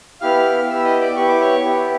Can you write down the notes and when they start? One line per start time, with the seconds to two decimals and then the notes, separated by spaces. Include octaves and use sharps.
0.21 B3 E4 G4 F5 F6
0.68 B3 E4 G4 E5 E6
0.84 D#5 D#6
1.01 D5 D6
1.16 B3 E4 G4 C#6
1.28 D6
1.41 C#5 C#6
1.64 B3 E4 G4